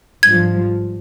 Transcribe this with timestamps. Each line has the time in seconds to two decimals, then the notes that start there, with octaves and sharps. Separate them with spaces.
0.23 G#1 G2 F3 G#6